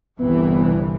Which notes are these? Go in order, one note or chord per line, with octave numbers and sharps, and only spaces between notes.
G1 C2 E3 B3